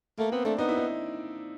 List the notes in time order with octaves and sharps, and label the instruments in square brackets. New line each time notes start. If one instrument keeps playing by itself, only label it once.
[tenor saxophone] A3 [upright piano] A#3
[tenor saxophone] B3 [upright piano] C4
[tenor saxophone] A3 [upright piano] D4
[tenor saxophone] B3 [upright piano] D#4
[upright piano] E4
D#4